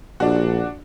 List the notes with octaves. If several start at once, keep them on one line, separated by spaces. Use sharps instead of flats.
A#1 D4 F#4